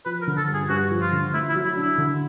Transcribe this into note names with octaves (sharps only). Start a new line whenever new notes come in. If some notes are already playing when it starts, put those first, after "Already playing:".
F3 B4
A#4
D3
A4
G2
G#4
G2 F#4
F3
F4
D3
A3 E4
E4
F#3
E4
D4 E4
D3